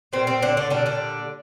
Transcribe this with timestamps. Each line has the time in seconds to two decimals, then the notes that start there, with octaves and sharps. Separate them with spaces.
0.13 A#2 G3 C4
0.27 C4
0.42 D3 D4
0.57 D3 D4
0.70 A#2 D3 G3 D4
0.86 D3 D4